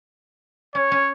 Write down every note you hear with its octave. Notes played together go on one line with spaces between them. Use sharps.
C#4 C#5
C#4